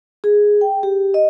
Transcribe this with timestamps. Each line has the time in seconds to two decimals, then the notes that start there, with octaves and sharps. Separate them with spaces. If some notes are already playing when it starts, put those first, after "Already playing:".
0.24 G#4
0.61 G5
0.83 G4
1.14 D#5